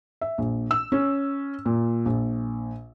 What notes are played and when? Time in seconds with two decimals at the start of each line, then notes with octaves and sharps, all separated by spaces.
0.21 E5
0.38 A#1
0.71 E6
0.92 C#4
1.66 A#2
2.05 A#1